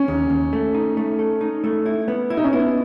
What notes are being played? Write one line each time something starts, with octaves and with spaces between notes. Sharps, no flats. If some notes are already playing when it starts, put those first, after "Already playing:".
Already playing: C#4
D#2
D#2
A3
D#4
A3
A4
D#4
A3
E4
B3
E4
D#4
C#4
B3 E4